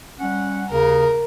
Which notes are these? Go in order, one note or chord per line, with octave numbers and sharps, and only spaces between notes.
G3 C#4 F#5
D#2 C#3 A#4